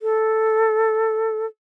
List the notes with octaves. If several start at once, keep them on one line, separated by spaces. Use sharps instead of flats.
A4